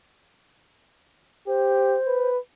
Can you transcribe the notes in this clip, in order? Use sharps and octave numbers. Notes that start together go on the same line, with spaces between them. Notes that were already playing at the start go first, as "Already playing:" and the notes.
G4 C5
B4